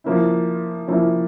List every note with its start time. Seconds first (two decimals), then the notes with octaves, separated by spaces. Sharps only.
0.04 F3 A#3 C#4 E4
0.88 F3 A#3 C#4 E4